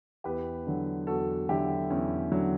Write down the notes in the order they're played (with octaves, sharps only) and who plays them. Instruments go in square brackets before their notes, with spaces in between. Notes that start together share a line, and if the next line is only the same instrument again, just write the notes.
[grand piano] E2 G4 B4
D3 F#3
E2 F#4 A4
D3 F#3 E4 G4
E2 C#4
D3 F#3